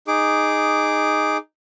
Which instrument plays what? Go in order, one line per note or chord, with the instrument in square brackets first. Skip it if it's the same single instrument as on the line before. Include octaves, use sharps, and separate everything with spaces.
[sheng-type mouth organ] D#4 G#4 D6